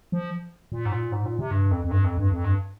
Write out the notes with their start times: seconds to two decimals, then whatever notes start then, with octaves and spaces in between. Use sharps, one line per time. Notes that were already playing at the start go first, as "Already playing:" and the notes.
0.12 F3
0.72 A#2
0.85 G#2
0.92 A#2
1.12 G#2
1.25 A#2
1.39 C3
1.51 G2
1.71 F2
1.84 F2
1.91 G2
2.04 F2
2.17 G2
2.31 F2
2.44 G2